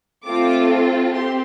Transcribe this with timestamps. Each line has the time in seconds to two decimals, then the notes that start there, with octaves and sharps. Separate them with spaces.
0.25 A3 C4 F4 A4 D6
1.13 C4 G4 C6